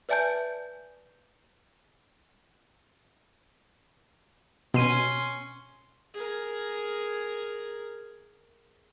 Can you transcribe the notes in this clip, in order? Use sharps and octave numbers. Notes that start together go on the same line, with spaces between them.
B4 D5 E5 G#5 A5 G6
B2 C#4 C6 D#7
G#4 A#4